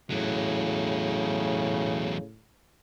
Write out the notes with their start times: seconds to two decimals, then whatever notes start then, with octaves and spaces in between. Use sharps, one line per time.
0.10 E2 A2 C#3 F#3